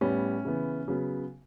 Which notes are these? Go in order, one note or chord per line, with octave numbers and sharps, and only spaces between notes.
A2 G3 B3 C#4
C#3 E3 B3
C#3 F#3 B3